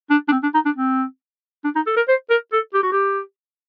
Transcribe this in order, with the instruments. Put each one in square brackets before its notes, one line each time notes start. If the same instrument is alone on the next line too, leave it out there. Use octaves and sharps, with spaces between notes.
[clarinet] D4
D4
C4
D4
D#4
D4
C4
D4
D#4
A4
A#4
C5
A#4
A4
G4
F#4
G4